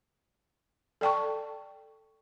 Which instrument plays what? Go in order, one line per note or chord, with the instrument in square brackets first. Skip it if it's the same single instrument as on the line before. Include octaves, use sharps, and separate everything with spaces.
[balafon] A4 D5 G5 A5 C#6